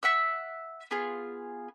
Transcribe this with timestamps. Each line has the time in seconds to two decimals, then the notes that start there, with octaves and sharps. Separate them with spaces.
0.03 E5 F#5 E6
0.91 B3 F4 G#4